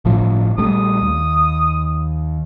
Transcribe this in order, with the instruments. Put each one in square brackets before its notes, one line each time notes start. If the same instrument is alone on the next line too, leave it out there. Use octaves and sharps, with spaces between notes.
[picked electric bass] G1 A2 F3
[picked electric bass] A#1 G3 A3 [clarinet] D#6
[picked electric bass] D#2